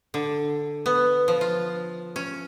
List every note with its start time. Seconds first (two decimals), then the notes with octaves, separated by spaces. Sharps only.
0.14 D3
0.86 B3
1.28 F3
1.41 F4
2.16 C#4